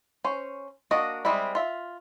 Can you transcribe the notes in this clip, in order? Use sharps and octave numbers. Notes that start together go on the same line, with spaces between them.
C#4 C5
A#3 D4 F#4 D#5
G3 G#3 C4 E4
F4 E5